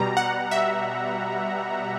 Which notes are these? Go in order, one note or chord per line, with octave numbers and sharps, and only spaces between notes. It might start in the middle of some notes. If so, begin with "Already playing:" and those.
Already playing: B2 G3 A#5
F#5
E5